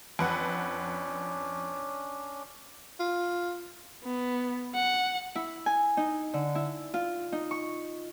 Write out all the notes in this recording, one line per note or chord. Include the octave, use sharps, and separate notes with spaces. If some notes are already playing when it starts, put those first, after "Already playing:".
F2 C#4 D4 B4 F#5
F4
B3
F#5
E4
G#5
D#4
D3
E4
F4
D#4
C#6